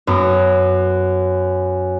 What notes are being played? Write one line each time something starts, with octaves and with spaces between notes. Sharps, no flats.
F#2 B3 D#6